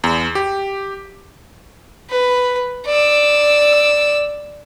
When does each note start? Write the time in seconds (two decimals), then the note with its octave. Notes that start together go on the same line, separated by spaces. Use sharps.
0.04 E2
0.35 G4
2.10 B4
2.86 D5 E6